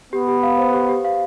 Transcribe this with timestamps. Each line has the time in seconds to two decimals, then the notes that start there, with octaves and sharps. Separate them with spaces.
0.13 B3 G4
0.28 G4
0.43 F5
0.58 C5
0.74 G4
0.89 G4
1.05 F5